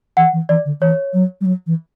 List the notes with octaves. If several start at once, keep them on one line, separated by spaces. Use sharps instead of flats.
E3 F#5
E3
E3 D5
D3
E3 C#5
F#3
G3
F#3
E3